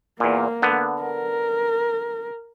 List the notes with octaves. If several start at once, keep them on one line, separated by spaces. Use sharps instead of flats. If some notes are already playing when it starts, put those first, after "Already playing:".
E2 A#2 A#3
D3 B3
A#4